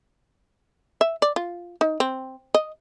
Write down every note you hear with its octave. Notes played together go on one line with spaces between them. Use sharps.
E5
D5
F4
D#4
C4
D#5